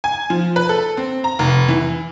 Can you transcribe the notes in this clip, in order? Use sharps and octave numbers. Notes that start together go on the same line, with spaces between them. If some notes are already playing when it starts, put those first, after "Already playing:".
G#5
F3
B4
A4
C4
A#5
F1
E3